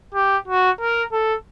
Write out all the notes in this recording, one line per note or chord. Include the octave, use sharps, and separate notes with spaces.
G4
F#4
A#4
A4